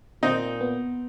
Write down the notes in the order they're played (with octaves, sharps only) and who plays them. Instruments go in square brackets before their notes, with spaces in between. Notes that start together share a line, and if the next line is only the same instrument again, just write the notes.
[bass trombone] A#2 [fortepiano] C4 D#4
[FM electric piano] B3